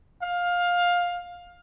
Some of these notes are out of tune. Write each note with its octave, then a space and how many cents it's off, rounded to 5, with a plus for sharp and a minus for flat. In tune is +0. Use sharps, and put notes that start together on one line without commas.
F5 +15